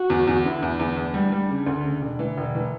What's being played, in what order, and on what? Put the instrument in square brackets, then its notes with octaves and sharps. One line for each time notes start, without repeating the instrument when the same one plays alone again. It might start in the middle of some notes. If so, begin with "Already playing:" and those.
Already playing: [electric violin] F#4
[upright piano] E2
E2
[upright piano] D3 [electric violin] E4
[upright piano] E2
E2
[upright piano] E2 [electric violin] D4
[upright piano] G3
G3
C#3
D2
C#3
E1
E3
E1
E3